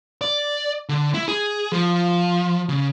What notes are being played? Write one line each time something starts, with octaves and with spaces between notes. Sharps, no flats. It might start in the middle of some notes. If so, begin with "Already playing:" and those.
D5
D3
E4
G#4
F3
C#3